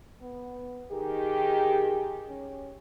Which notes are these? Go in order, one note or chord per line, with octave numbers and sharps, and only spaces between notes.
B3
D#3 G4 G#4
C#4